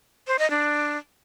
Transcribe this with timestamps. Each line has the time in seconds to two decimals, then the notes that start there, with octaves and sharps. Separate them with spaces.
0.27 C5
0.39 D#5
0.50 D4